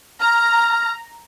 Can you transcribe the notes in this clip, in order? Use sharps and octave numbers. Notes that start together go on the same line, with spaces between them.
A#5 F6